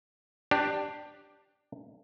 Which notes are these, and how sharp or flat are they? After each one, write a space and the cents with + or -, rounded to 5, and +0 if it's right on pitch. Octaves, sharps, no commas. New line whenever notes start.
D4 +15 G4 +0